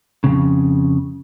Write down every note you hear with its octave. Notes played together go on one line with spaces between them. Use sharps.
F2 A2 C#3